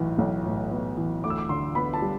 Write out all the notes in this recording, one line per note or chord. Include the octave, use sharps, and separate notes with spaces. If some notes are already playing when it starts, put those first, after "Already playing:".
Already playing: B1 A2 E3 B3
B1
A2
B3
E3
D2 D6
E6
D6
D3 C6
B3 B5
A5
G3